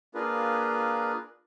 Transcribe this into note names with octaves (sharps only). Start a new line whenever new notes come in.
A#3 D4 F4 G#4 A#4 B4